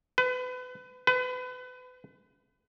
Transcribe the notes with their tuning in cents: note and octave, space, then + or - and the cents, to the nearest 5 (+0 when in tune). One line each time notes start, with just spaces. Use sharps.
B4 +30
B4 +30